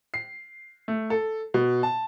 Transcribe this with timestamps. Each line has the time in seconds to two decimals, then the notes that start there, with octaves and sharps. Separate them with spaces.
0.14 C7
0.88 A3
1.10 A4
1.54 B2
1.83 A5